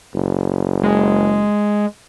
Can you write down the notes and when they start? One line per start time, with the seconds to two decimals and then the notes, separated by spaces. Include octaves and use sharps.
0.15 F#1
0.83 G#3